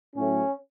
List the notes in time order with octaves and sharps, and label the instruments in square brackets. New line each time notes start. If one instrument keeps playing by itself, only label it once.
[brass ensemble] A2 F#3 A3 C#4